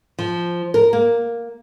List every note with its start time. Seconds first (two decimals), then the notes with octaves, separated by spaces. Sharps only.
0.19 F3
0.74 A#4
0.93 A#3